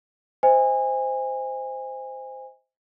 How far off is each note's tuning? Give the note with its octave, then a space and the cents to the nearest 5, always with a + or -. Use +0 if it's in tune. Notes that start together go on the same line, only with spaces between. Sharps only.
C5 -10 D#5 +35 G#5 -25